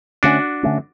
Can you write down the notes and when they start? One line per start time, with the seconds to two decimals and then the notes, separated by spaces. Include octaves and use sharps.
0.23 D3 A3 C#4 D4 F#4
0.63 D3 A3 C#4